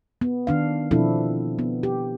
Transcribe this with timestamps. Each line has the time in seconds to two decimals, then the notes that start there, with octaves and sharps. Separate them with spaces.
0.21 B3
0.47 D#3 D4 F5
0.91 B2 F3 C4 D4 E4 A4
1.59 B3
1.83 G4